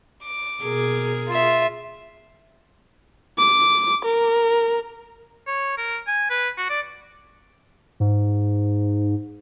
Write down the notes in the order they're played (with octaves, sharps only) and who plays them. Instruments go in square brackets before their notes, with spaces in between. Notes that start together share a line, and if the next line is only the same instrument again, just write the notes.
[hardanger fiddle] D6
[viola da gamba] B2 G#4 A#4
[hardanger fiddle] F4 E5
[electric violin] D6
A#4
[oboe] C#5
A#4
G#5
B4
F#4
D5
[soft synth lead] G#2